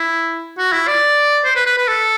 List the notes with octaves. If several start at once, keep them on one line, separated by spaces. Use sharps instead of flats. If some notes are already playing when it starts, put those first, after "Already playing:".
Already playing: E4
F#4
E4
D5
C5
B4
B4
B4
A4